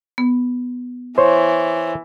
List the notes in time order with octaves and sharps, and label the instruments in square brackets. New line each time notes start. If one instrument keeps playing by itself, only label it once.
[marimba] B3
[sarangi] E3 [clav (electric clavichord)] C5 C#5